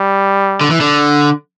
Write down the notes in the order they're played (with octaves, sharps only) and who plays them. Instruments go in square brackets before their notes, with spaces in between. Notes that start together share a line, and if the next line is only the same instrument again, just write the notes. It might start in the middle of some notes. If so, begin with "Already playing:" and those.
Already playing: [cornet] G3
[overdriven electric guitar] D3
E3
D3